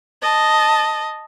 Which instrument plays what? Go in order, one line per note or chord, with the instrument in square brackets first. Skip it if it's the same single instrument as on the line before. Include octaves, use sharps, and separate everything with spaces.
[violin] D#5 A5